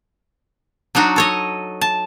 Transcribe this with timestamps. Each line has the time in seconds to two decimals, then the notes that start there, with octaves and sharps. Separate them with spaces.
0.95 F#3 D4 D#4 F#4
1.16 A4 C#5 D#5
1.81 A5